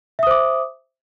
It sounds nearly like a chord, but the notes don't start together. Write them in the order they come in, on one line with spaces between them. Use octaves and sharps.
E5 D#6 C5 D6